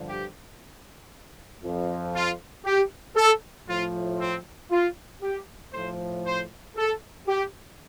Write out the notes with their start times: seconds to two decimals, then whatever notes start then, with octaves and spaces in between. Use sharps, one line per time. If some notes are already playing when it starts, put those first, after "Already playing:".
Already playing: G2 D3 F3
0.08 G4
1.62 F2 F3
2.14 F4
2.65 G4
3.15 A4
3.67 A2 F3 F4
4.19 C4
4.71 F4
5.21 G4
5.72 A2 F3 C5
6.25 C5
6.76 A4
7.27 G4